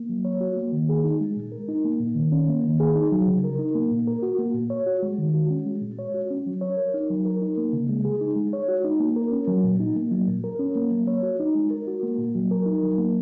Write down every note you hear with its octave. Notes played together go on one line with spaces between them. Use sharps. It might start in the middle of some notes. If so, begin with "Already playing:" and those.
Already playing: A#3
F#3
C#5
F#4
A#3
D#3
G#4
D#4
G#3
A#2
A#4
D#4
A#3
A#2
D#3
C#4
A#3
D#3
G#4
D#4
F#3
C#3
A#4
D#4
A#3
A#2
A#4
F#4
A#3
A#2
C#5
F#4
G#3
D#3
F#4
C#4
G#3
A#2
C#5
F#4
C#4
F#3
C#5
A#4
D#4
F#3
A#4
D#4
A#3
C#3
G#3
G#4
D#4
G#3
C#5
F#4
D#4
A#3
A#4
C#4
F#3
A#2
D#4
A#3
F#3
A#2
A#4
C#4
A#3
F#3
C#5
F#4
D#4
G#3
A#4
F#4
A#3
A#2
F#3
A#4
D#4
F#3
A#3